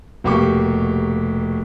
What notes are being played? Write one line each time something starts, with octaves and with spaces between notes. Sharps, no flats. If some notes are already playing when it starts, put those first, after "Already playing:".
F1 B2 A#3 G4 C#6 D6